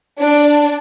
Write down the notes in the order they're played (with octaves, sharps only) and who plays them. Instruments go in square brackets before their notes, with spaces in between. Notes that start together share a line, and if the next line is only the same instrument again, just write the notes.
[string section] D4